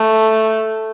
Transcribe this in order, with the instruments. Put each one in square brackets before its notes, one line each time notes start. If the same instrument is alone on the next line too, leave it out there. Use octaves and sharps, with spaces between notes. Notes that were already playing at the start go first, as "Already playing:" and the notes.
Already playing: [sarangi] A3